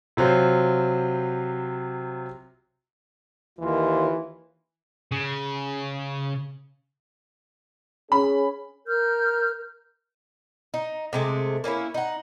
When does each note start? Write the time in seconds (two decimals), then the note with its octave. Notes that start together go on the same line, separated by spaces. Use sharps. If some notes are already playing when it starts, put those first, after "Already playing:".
0.17 C3 F#3 F4 C5
3.59 D#2 E3 F4
5.12 C#3
8.12 C#4 G#4 B5
8.86 A#4 F6 G6
10.74 D#4
11.13 C3 G#3 A3
11.64 A#3 C#4 D#4 E4
11.94 D#4 F#5